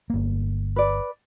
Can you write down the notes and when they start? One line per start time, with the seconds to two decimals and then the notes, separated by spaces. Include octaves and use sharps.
0.10 G1 A#3
0.76 B4 D5